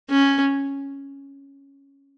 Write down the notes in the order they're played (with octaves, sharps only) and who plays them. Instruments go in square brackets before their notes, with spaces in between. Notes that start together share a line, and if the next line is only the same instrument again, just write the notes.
[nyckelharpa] C#4